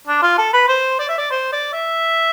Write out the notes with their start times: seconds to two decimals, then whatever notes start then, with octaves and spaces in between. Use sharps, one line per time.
0.07 D4
0.22 F4
0.38 A4
0.53 B4
0.68 C5
0.99 D5
1.09 E5
1.18 D5
1.31 C5
1.52 D5
1.73 E5